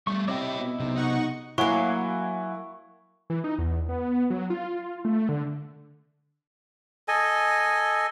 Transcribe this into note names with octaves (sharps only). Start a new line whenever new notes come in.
G3 A3 C#6
C3 E4 C#5 D#5 E5 G5 D6
B2
B1 C3
D#4 F#5 C#6
F#3 A#3 E4 F#5 G#5 C#6
E3
D#4
E2
B3
F#3
F4
A3
D3
A4 D#5 G#5